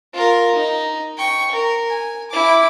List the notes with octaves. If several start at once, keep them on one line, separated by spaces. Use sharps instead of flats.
F4 A#4
D#4
G5 C#6
A#4
G#5
E4 D6